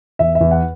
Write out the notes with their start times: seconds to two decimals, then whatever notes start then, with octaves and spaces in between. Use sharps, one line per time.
0.19 E2 E5
0.35 E5
0.41 E2
0.51 F#5